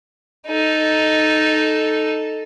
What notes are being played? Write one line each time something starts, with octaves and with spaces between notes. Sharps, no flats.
D#4 A4